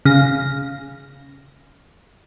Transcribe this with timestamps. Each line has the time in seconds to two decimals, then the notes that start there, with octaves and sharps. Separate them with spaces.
0.05 C#3 F5 A#6